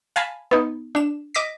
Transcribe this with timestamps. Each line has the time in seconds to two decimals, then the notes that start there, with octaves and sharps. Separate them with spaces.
0.16 F5 G#5 A5 B5
0.51 B3 D#4
0.95 D4 E7
1.34 D#5 D6 A#6 B6